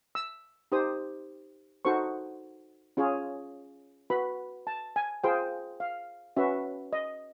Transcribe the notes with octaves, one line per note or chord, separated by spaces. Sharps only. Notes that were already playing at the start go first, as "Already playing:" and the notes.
E6
D#4 G4 C5 D#6
D#4 F#4 A4 C5 C#6
C#4 F4 G#4 C#5
F#4 B4 B5
A5
G#5
F4 G#4 C5 G5
F5
C#4 F#4 B4 E5
D#5